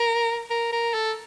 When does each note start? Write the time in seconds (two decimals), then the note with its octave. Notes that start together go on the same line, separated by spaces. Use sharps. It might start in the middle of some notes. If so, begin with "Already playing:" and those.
Already playing: A#4
0.50 A#4
0.72 A#4
0.94 A4